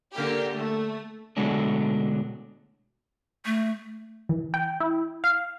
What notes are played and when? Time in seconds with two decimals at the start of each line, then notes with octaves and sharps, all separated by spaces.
0.14 D3 A#3 G4
0.54 A3
1.37 B2 D3 F#3 G#3 A3 D4
3.45 A3
4.29 E3
4.54 G5
4.80 E4
5.24 F5